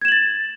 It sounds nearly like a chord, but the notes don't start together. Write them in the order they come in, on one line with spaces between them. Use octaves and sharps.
G#6 E7 F#7 A6